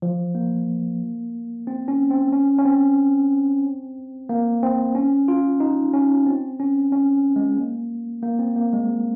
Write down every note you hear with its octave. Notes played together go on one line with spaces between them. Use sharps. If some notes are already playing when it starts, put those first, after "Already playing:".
F3
A#3
C4
C#4
C4
C#4
C#4
C4
A#3
C4
C#4
F4
D#4
C#4
C4
C#4
C#4
G#3
A#3
A#3
C4
A#3
G#3